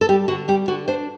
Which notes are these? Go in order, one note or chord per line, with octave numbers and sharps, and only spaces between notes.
A4
G3 G4
D3 F#4
G3 G4
D3 F#4
D4 C5